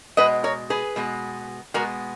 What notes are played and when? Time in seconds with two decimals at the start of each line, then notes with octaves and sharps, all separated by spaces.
0.17 B2 G#3 B3 B4 D#5
0.44 A#4 C#5
0.70 G#4 B4
0.96 B2 G#3 B3
1.74 B2 G#3 B3 F#4 A#4